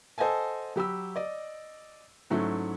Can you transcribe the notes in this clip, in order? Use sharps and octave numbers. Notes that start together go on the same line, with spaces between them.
A4 C5 D#5 F#5 G#5 A5
F#3 G4 B5 E6
D5 D#5
G#2 F#3 A3 C#4 E4